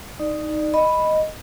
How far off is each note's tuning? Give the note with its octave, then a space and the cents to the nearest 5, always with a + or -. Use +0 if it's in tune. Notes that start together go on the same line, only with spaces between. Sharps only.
D#4 +0 D5 +25
D#5 +0 B5 +0